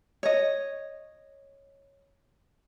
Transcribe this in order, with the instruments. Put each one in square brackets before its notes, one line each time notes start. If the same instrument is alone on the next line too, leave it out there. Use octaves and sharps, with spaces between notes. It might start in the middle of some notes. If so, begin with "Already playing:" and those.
[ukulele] C#5 D#5